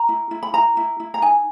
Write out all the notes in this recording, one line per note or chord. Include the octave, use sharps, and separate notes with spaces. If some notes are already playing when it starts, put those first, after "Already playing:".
Already playing: A#5
E4
E4
B5
E4 A#5
E4
E4
A#5
D#4 G#5